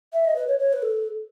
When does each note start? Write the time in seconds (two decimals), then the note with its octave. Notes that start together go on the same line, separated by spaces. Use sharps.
0.13 E5
0.25 D#5
0.36 B4
0.47 C#5
0.59 C#5
0.73 B4
0.82 A4